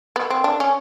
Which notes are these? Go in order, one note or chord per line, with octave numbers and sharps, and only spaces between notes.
B3
C4
D4
C#4